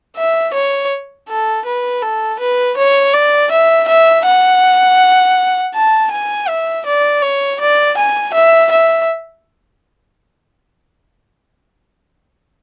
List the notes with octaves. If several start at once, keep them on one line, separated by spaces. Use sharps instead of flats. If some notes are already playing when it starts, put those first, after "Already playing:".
E5
C#5
A4
B4
A4
B4
C#5
D5
E5
E5
F#5
A5
G#5
E5
D5
C#5
D5
G#5
E5
E5